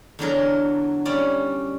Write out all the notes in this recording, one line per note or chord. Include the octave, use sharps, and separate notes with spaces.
E2 D3 F#3 A#4
G3 C#4 D5